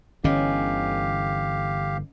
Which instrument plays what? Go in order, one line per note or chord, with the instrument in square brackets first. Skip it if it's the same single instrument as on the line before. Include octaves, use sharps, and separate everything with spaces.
[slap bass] G1 D3 E3 [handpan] C#4 D#5 [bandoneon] G4 F5